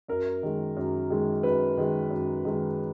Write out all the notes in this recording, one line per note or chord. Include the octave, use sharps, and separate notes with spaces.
F#2 A#4
D#3 G#3
F#2
D#3 G#3
F#2 B4
D#3 G#3
F#2
D#3 G#3